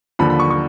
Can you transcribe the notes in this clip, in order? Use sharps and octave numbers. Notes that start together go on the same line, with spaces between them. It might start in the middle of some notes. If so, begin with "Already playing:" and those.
D#2 D3 F3 B5
B5
C#6
C#6